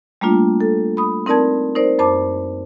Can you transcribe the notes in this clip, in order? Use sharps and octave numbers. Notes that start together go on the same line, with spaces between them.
G3 A3 A#3 D4 F4
A4
B5 D#6
C4 D#4 A#4 D5 A5 G#6
D#4 A#4 C5 D5
F#2 C5 A5 D6